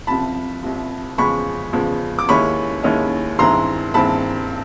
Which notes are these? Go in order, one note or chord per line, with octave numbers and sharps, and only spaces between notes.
C2 C3 F3 A5 B5
C2 C3 F3
E2 C#3 F3 G#3 B5 C#6
E2 C#3 F3 G#3
D6
D#2 D#3 G#3 C#4 E4 B5 C#6
D#2 D#3 G#3 C#4 E4
G2 D#3 G#3 C4 E4 A#5 C6
G2 D#3 G#3 C4 E4 A5 B5